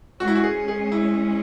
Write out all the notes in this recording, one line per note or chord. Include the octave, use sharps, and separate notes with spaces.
G#2 G#3 C#4 F#4
E4
F#4
G#4
G#4
E4